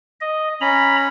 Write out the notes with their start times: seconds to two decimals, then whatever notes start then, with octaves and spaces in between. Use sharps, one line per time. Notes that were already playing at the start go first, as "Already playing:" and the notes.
0.20 D#5
0.61 C#4 A#5 B5